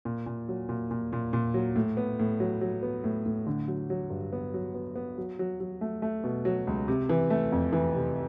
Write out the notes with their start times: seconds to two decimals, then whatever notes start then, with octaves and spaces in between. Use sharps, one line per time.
0.05 A#2
0.26 A#2
0.48 F#3
0.69 A#2
0.91 A#2
1.13 A#2
1.33 A#2
1.54 F#3
1.76 A2
1.97 B3
2.19 A2
2.40 F#3
2.61 F#3
2.83 B3
3.04 A2
3.26 A2
3.47 D3
3.68 F#3
3.90 F#3
4.10 G2
4.32 B3
4.54 F#3
4.74 B3
4.96 B3
5.18 F#3
5.39 F#3
5.60 F#3
5.81 A3
6.02 A3
6.24 B2
6.45 F#3
6.67 C#2
6.88 C3
7.09 E3
7.30 A3
7.52 F2
7.73 E3
7.95 C3